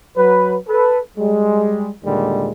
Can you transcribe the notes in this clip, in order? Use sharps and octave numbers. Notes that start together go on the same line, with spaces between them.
F#3 B4
A4 B4
G3 G#3
D#2 A#2 D3 G3 G#3